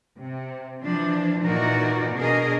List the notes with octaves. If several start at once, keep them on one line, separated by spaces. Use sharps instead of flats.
C3
E3 F3 D4
A#2 E3 D#4 F#4 A#4 D5
B2 D4 G#4 A#4 D#5